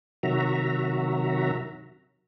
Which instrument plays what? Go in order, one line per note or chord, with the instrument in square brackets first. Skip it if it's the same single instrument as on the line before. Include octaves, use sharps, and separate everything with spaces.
[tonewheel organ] C3 D#3 F#3 F#4 E5 A#5